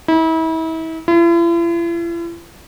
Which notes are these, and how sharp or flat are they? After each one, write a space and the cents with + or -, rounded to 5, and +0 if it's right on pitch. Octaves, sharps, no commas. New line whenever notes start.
E4 -35
E4 +45